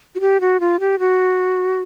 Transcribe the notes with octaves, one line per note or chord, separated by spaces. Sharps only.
F#4
G4
F#4
F4
G4
F#4